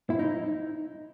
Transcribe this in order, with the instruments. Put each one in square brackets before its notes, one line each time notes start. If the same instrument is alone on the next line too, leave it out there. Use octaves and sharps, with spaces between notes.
[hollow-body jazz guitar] E4
D#4